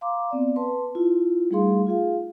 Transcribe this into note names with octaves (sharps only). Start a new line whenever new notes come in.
F5 A#5 C6 D6
B3 C4 D5
B4 A5 C6
E4 F4
G3 A3 D#4 G#4 F5 C6
F4 G#4 F5